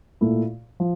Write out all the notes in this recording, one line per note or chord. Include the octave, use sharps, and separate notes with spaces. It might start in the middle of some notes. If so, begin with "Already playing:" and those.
A#2 A3 E4
F3